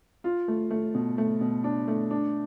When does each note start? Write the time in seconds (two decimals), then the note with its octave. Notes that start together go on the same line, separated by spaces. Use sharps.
0.24 F4
0.48 A3
0.70 A3
0.94 B2
1.18 A3
1.41 B2
1.64 D4
1.88 A3
2.11 D4